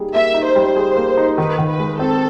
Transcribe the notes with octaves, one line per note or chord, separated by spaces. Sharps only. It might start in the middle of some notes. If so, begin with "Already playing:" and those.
Already playing: G3 A#3 D#4 G#4
A#3 E5
D#4
C5
G3
G#4
A#3
D#4
D#3 B4
D#3
B4
G#3
C4 A4